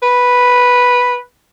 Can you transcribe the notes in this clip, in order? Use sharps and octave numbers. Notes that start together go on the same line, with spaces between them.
B4